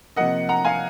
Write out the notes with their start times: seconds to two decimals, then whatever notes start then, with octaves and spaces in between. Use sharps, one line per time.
0.16 C3 F3 A#3 D#5 F#5
0.49 F#5 A#5
0.65 F5 G#5